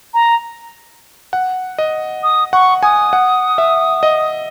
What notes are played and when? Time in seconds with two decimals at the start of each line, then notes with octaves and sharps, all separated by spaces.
0.14 A#5
1.33 F#5
1.78 D#5
2.23 D#6
2.53 F#5 C#6
2.83 G#5 D#6
3.13 F#5
3.58 E5
4.03 D#5